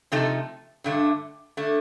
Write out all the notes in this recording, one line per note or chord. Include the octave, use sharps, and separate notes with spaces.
C3 F3 A3 D#4 A4
G2 D3 A3
D3 A3